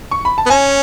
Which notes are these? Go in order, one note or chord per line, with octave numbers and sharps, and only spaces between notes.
C#6
B5
A5
B3
C#4 G#5